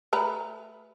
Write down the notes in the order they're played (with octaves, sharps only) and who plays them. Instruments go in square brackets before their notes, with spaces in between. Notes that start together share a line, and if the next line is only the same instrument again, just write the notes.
[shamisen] A3 B4 A#5